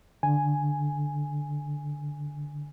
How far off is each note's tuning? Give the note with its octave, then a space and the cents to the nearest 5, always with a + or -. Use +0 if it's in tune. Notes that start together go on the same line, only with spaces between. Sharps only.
D3 +0 G#5 +0